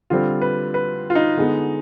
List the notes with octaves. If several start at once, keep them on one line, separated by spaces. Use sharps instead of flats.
D3 G3 C4 F4
B4
B4
F4
D#4
D3 G#3 B3